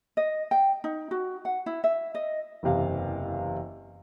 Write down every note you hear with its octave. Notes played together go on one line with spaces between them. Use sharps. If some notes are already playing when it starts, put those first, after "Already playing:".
D#5
G5
D#4
F#4
F#5
E4
E5
D#5
F#1 E2 C3 F5